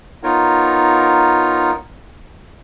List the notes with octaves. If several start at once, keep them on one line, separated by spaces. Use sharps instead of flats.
B3 D#4 F4 A#4 C#5